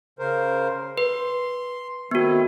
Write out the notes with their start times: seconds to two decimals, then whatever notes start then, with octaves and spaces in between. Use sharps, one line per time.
0.19 C#3 A#4 C5
0.98 B4 C6
2.11 D#3 A3 B3 C4 F#4